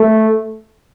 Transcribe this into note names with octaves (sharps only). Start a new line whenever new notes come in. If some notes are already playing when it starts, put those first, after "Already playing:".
Already playing: A3